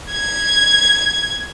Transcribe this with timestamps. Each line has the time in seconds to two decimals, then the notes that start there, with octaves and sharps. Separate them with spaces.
0.12 G#6